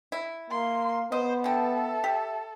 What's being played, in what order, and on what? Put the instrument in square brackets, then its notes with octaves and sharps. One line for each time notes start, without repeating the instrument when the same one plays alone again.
[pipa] E4
[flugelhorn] A#3 [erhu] C6
[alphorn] B3 [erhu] C5 [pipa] D#5
[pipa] D3 G5 [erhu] A4 [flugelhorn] E5
[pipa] G4